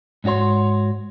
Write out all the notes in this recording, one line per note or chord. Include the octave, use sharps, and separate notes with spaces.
G#2 C#4 F#4 C#5 C6